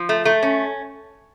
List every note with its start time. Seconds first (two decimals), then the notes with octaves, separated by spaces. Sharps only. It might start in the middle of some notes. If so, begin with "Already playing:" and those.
Already playing: F3
0.09 A3
0.25 A3
0.43 C#4